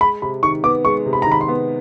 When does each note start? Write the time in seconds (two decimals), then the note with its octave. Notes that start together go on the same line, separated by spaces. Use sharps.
0.01 G#3 B5
0.22 C3 B5
0.43 D#3 C#6
0.64 B3 D6
0.85 G#3 C#6
1.06 C3
1.13 B5
1.22 D#3 A#5
1.32 B5
1.41 C6
1.48 B3